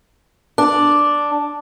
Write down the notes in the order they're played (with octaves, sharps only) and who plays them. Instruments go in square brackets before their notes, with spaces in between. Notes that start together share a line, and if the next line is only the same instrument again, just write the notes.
[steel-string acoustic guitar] D4